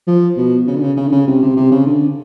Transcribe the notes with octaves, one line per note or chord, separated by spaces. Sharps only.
F3
B2
C#3
D3
C#3
C#3
D3
C#3
C3
C3
C3
C#3
D3